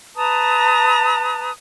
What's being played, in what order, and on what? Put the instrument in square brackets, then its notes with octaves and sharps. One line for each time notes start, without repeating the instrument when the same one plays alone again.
[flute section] B4 A5 A#5 D#6